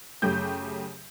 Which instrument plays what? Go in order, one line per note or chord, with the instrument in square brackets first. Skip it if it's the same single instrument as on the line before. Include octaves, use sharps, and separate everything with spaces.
[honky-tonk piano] F#2 C#3 A3 G4 G6